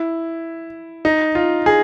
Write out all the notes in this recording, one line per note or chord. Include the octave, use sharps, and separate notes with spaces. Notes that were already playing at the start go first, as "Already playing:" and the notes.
Already playing: E4
D#4
F4
G#4